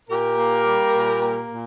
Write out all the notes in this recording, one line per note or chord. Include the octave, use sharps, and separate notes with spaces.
A#2 G4 A#4
A#3
G3
A#2
A#3
A#2